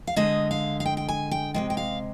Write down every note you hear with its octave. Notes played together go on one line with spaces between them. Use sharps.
F5
D3 G#3 D#5
F5
F5
G5
G5
G#5
G5
C3 F3 G#3 G5
G5
F5